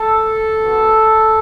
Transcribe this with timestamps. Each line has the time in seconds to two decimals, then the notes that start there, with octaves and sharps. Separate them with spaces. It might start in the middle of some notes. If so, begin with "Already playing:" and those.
Already playing: A4
0.62 B3 F#4